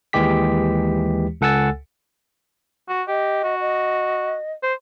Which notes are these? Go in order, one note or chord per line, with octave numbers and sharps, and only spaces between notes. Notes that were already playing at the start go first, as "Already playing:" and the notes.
D#2 E3 G#3 G4 B6
C#2 A4 F#5 G#5 E6 A6
F#4
G4 D#5
F#4
D#5
C5